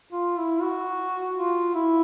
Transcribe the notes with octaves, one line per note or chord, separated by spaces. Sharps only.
F4
E4
F#4
F4
E4